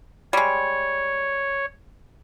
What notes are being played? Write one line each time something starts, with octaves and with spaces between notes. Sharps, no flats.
G3 G#3 C#5